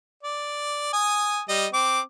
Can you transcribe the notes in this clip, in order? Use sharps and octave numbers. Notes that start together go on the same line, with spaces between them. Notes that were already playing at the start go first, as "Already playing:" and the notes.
D5
G#5 D#6
G3 D#5
C4 D6